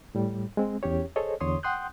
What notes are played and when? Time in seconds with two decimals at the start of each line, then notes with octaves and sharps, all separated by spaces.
0.15 A2 G3
0.57 G#3 C4
0.83 E2 C#4 G4 C#5
1.16 G#4 A4 C5 C#5 D#5
1.41 E2 D3 C#5 C6 D#6
1.63 F#5 G5 C6 D#6 F#6 G6